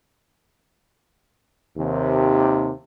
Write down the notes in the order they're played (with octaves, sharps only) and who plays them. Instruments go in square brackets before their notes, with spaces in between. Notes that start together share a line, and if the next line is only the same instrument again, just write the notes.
[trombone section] D#2 C3